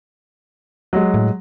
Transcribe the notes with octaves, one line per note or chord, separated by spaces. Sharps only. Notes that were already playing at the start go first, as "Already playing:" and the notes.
F#3 G#3
A2